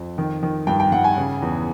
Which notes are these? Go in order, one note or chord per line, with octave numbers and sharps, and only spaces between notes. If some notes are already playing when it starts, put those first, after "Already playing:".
Already playing: F2
D#3
D#3
G2 G5
G5
G2 F#5
G#5
C#3
E2